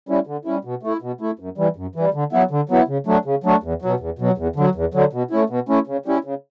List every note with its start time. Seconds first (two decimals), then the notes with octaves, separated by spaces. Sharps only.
0.09 G3 C#4 E4
0.27 D3
0.45 G3 C#4 E4
0.65 B2
0.83 A3 E4
1.02 B2
1.21 A3 E4
1.39 F#2
1.58 E3 G3
1.76 F#2
1.95 E3 G3
2.14 D3
2.32 F#3 B3 E4
2.51 D3
2.69 F#3 B3 E4
2.88 C#3
3.06 F#3 A3 D4
3.25 C#3
3.44 F#3 A3 D4
3.63 E2
3.82 B2 F#3
4.00 E2
4.19 B2 F#3
4.38 E2
4.56 D3 F#3
4.75 E2
4.94 D3 F#3
5.13 B2
5.31 A3 C#4 E4
5.50 B2
5.69 A3 C#4 E4
5.87 C#3
6.06 G3 C#4 E4
6.24 C#3